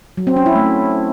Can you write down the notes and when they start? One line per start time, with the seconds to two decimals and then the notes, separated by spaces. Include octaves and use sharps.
0.17 F#3
0.27 C4
0.36 C#4
0.46 E4
0.55 A3